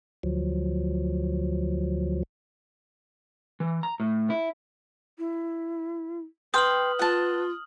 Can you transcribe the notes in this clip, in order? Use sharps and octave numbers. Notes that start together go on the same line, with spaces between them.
D2 F3 F#3
E3
A#5
A2
E4
E4
B4 G5 C6 D#6 F6 F#7
F4 F#5 A5